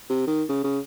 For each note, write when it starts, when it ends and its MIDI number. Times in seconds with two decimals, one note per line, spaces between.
0.10 0.27 48
0.27 0.44 51
0.49 0.63 49
0.64 0.79 49